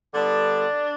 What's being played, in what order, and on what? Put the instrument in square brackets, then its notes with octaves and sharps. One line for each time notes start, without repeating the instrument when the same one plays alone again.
[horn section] D3 G3 B3 D4